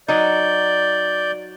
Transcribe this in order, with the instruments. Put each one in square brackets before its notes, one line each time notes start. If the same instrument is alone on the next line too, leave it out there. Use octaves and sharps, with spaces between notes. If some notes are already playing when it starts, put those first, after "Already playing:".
[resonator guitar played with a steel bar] F#3 D#4 [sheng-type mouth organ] D5 G6